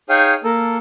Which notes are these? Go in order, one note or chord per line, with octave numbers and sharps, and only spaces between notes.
D#4 G#4 C#5 F5 G5 G#5
A#3 A4 A#4 A5